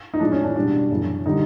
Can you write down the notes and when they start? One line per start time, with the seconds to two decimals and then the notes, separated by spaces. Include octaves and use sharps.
0.14 D#4
0.20 A2 F3 G#3 D4
0.32 C#4
0.43 D4
0.56 B2 G3 D4
0.91 F#2 C#3 E3
1.26 D3 G3 D#4